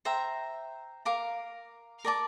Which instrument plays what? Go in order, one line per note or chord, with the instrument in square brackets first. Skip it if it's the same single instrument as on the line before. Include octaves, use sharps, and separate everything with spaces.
[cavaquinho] C5 E5 G5 A#5
A#4 F5 A#5 D6
A#4 D5 A5 D6